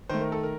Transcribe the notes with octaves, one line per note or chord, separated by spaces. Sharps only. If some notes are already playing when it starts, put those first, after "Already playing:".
D#3 A3 C5
A#4
A4
A#4